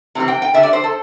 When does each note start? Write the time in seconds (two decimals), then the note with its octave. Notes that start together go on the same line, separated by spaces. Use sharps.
0.15 C3 E3 G3 C4
0.28 G5
0.42 G5
0.54 D3 G3 D4 E5
0.63 D5
0.73 C5
0.84 A4